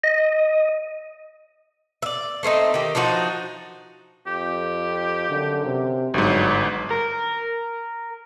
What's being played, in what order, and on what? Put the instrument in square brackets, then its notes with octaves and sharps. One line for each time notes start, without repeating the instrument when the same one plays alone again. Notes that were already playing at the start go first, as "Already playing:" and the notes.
[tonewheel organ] D#5
[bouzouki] D5 E5
A3 C4 C#4 D#4
D#3 G4
F3 D4 D#4 F#4
[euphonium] F2 [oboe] G4
[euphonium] F#2 [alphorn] D3
[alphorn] C3
[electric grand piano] G1 G#2 [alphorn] F#3 [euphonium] D4 [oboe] C#5
[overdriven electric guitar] A#4